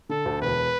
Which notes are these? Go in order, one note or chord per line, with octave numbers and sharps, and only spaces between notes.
D3 A4
D2
E1 B4